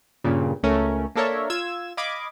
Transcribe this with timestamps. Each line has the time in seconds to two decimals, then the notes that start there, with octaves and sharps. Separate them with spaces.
0.24 G2 A#2 C#3
0.63 C#2 A3 C#4 A#4
1.15 A#3 D4 A4 A#4 C#5 E5
1.50 F4 E6 G#6 E7
1.97 D#5 F5 B5 D6 G#6